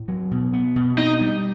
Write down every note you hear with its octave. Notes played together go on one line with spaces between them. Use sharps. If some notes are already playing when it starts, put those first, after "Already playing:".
Already playing: A2
F#3
B2
B3
B2
C4 D#4
G3